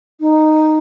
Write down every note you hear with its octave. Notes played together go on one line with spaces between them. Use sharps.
D#4